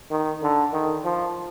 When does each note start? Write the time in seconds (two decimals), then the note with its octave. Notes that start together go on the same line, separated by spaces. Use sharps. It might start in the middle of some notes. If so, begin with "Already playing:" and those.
0.11 D#3
0.42 D3
0.73 D#3
1.04 F3